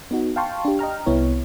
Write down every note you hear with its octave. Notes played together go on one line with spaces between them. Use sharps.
B3 D#4 F#4
F5 G5 A5 C6 C#6
D4 G4
D#5 G5 A#5 F6
C2 C3 B3 E4 C#5